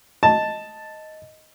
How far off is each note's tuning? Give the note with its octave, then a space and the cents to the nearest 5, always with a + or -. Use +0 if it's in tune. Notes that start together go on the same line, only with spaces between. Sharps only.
D#5 +5 A5 +0